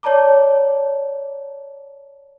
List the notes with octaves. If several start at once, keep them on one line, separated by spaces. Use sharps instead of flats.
C#5 D5 A5 A#5 D6